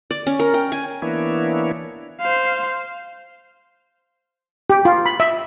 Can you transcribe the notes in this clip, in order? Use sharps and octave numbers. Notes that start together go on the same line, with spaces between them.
D5
C#4
A#4
G5
G#5
E3 A#3 B3 D4 E4 C#5
C5 F5
G4
F4
B5
E5